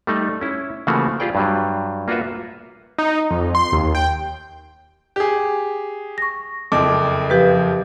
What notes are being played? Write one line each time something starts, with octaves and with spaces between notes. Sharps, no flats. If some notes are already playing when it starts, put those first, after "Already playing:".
G3 A3 D#4
C#4 E4
C#3 E3 F3 A3 A#3 F#4
F4 G4 G#4 D5 G5
G2 F#3 G3
A#3 F4 F#4 B4 E5
D#4
F2
C6
D#2
G5
G4 G#4
C#6 A#6
F#1 F2 D6
F3 G4 B4